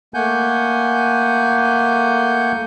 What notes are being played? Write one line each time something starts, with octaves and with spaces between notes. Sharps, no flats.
A3 A#3 F#5 G#5 G6